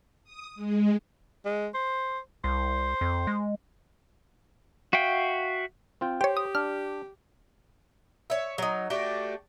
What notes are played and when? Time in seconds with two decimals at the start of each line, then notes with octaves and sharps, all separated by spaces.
0.24 D#6
0.55 G#3
1.45 G#3
1.74 C5
2.44 C2 C5
3.01 F2
3.27 G#3
4.93 F#4 E5 F5 G5
6.01 C4 F4 G5
6.21 G4 C5 C#5 G5
6.37 D#6
6.55 D4 F6
8.30 C#5 E5
8.58 F#3 D#4
8.90 A3 D4 F#4 G4